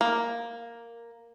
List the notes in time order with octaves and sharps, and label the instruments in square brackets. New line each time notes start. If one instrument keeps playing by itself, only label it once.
[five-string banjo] A#3